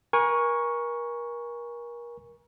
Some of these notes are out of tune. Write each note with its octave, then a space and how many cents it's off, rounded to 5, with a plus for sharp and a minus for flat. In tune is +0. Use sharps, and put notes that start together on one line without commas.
A#4 +30 G#5 -15 C#6 +0